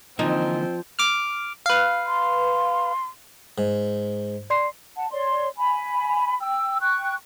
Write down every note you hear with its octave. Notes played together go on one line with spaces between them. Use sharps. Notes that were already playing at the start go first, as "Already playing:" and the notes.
D3 E3 F3 A#3 C4 D#4
D6 F6
B4 F5
C6
G#2
D5 C6 C7
F#5 A5
C#5 D5 C6
G#5 B5
G5 E6
G5 C#6 F#6